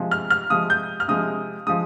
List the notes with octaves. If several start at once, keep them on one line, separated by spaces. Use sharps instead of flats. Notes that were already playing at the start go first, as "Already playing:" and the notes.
Already playing: C3 F3 G#3
F6
F6
C3 F3 G#3 D#6
G6
F6
C3 F3 G#3 D#6
F3 G#3 D#6